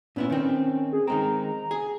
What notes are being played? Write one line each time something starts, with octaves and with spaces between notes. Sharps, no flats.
A#2 B3 C#4 E4
D#3 C4
G#4
D#3 G#3 C4 A#5
G#4